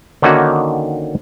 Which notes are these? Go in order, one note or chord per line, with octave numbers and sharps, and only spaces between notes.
D3 D#3 A#3 C#4 D#4 F#4